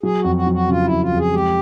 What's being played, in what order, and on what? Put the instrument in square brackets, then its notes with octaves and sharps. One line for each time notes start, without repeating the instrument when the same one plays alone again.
[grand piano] F#3 [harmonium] G#4
[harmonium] F#4
[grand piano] F2
[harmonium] F#4
[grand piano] F#3
[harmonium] F#4
[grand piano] C#3 [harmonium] F4
[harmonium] E4
[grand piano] F2
[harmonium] F4
[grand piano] F2
[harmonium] G#4
[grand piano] G#3 [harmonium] G4